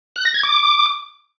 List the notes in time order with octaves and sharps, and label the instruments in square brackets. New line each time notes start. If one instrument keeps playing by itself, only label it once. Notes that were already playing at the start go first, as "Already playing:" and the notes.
[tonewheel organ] F#6
A#6
G#6
D6